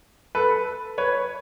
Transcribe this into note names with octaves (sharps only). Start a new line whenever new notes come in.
A4 B4
B4 C#5